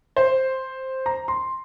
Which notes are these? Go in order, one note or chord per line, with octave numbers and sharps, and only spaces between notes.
C5
A#5
C6